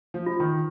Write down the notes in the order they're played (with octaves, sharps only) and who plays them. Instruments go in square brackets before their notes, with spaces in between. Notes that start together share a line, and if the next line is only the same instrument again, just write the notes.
[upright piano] F3
[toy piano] F4
[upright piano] D#3